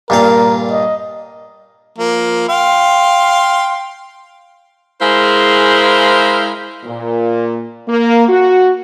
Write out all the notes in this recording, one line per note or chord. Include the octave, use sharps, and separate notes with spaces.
G2 A#2 A#4 F5
D#5
F3 A#3
F5 G5 C6
G#3 E4 G#4 A#4 C5 F5
A#2
A#3
F#4